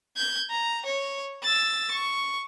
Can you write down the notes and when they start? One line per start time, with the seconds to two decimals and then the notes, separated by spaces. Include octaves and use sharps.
0.17 G6 G#6
0.51 A#5
0.86 C#5
1.44 E6 A6
1.92 C#6